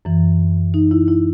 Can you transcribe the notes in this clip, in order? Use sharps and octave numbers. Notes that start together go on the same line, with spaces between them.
F#2 E3
D#4
E4
E4